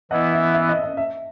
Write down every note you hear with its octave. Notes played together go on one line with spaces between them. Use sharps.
E3 B3 E4 D#5 F#5
E5
E5
D#5
D#5
E5